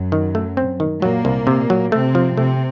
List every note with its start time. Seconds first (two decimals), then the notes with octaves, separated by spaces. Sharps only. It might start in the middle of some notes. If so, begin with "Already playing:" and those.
Already playing: F#2 F#3
0.12 D#3
0.35 A3
0.57 C4
0.80 D#3
1.02 A#2 F#3 A#3
1.25 C2
1.47 C3
1.70 F#3
1.92 C3 A3 C4
2.15 F3
2.37 C3 A3 C4